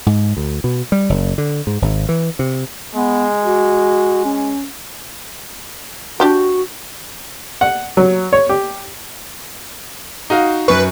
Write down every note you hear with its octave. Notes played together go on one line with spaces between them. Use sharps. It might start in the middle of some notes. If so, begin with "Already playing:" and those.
G#2
D2
B2
G3
F#1
D3
G#2
G#1
E3
C3
G#3 B3
F#4
C#4
D4 F#4 G4 G5
F#5
F#3
C#5
G4
D#4 F#4 F5
F#2 B4 C#6